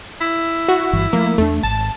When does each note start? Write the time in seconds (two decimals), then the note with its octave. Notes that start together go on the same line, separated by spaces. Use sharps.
0.21 E4
0.68 F#4
0.93 G1 G2 E3
1.13 F3 A3 A#3
1.38 E2 A3 C4 D4
1.63 G#1 A5